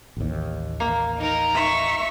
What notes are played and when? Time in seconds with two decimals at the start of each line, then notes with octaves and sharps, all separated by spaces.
0.17 A1 D#2
0.80 A#3
1.17 D#4 A#4
1.54 D#4 E5 C#6